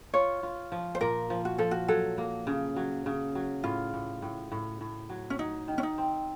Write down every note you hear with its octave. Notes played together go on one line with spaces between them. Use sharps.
F4 C#5
F4
F3
C5
A#2 A#4
F3
F#4
F3 A4
F#4
F#3 A4
A#3
C#3
F#3
C#3
F#3
A2 F4
A2
A2
A2
A2
F#3
C#4
F#3 D#4
D#3
C#4
D#4
C4